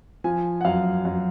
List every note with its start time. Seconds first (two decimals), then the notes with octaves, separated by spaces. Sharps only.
0.24 F3 G#5
0.61 F#5
0.65 F#2 F5
1.05 F#2